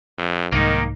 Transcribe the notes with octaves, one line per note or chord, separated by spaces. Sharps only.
F2
C2 G#2 D#3 A#3 D#4